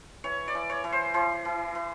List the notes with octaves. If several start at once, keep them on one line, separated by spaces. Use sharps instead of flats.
E3 C#5
D5
E3
C#5
E3
C5
E3 C5
E3
E3